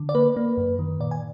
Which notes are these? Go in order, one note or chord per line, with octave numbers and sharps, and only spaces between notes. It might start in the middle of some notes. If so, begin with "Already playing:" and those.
Already playing: D3
D5
A#3 B4
A#3
F#2
D#3
A#2 D5
G#5